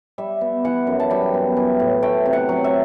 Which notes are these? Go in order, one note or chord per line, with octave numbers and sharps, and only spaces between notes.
G3 E5
B3
E3 F#5
F#2
A5
G3 G5
B3
E3
A2
A3 G5
C3
F#5
F#3
E5